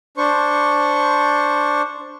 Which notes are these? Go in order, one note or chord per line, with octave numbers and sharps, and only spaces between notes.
D4 C5 C#6